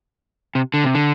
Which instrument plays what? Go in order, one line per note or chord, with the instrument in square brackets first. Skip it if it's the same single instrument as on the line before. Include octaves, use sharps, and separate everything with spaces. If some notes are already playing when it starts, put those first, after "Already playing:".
[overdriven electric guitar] C3
D3
C3
D3